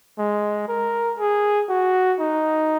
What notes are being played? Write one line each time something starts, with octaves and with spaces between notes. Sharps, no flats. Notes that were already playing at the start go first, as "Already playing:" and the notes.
G#3
A#4
G#4
F#4
D#4